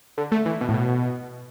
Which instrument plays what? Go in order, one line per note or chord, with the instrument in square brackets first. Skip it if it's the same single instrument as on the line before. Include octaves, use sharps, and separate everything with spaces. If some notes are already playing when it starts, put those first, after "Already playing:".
[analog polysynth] D3
A3
E3
B2
A2
B2